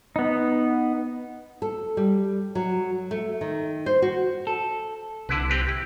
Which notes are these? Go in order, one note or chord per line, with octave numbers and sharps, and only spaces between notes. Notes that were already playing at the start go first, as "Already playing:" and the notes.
B3 D#4
A4
G3
F#3
A3
D#3
C5
F#4
A4
C2 D3 E4 B4
C4 G4 B4
E4 G4